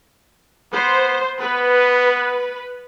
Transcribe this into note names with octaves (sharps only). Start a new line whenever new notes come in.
B3 C5
B3 B4